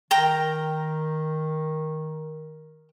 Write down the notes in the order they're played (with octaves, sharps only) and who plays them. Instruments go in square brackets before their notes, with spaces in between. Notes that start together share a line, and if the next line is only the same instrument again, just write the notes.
[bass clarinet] D#3 [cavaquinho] A#4 G5 A#5